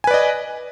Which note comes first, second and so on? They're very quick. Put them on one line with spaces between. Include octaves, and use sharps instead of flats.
G#5 B4 D5 D#5